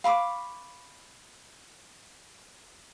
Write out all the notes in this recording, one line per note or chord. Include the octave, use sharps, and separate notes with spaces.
F5 B5 C#6 D6